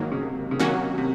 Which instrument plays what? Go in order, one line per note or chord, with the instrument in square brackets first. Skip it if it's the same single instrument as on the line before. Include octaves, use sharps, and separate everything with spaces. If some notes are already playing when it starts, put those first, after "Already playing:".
Already playing: [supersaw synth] G#2 D#3 F#3 A#3
[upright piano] C#3
C3
C#3
[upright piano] C3 [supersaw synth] D#3 F#3 A#3 C#4 F#4
[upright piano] C3